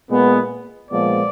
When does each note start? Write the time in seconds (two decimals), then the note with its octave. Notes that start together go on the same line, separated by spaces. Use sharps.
0.09 A#2 G#3 B3
0.91 A#2 F3 G#3 B3 D5